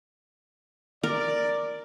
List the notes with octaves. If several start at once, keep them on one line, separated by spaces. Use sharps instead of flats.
A#4 D5